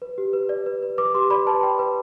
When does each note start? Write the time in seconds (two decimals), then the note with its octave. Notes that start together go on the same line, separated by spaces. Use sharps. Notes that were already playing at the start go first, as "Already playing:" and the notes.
0.02 B4
0.18 G4
0.33 B4
0.49 D5
0.66 B4
0.83 B4
0.98 B4 D6
1.15 G4 C6
1.30 D5 B5
1.47 B4 A5
1.63 D5 G5
1.79 B4